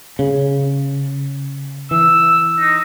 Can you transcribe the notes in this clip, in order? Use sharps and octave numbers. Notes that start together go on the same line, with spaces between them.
C#3
E3 E6
D#4